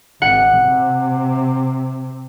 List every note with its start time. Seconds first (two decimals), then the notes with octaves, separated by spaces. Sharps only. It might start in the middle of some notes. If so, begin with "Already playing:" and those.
0.22 G#1 F#5
0.60 C3